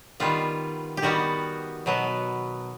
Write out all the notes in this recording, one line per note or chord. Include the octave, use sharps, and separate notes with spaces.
D#3 G3 B3 F4
G4
D#3 G3 B3 F#4
B2 F#3 B3